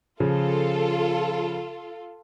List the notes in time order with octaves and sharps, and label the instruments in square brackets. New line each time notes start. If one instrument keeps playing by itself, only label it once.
[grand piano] C#3 F3 [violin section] F4 A4